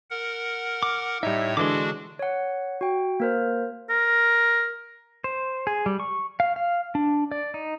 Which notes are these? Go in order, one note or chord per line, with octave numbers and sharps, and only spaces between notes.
A#4 F#5
D6
A2 G3 D#4 C#5 E5
D3 E3 G#3 D4 F#4 C6 D6
C#5 F#5
F#4 G5
A#3 A#4 C5
A#4
C5
G#4
G3
C#6
F5
F5
D4
D5
D#4